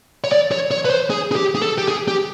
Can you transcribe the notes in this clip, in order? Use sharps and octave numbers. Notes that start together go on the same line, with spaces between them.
C#5
D5
C#5
C#5
B4
C5
G#4
G#4
G4
G#4
A4
G4
G#4
G4